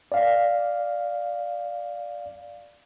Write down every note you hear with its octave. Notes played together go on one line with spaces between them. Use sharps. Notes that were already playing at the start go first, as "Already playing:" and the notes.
D5 F5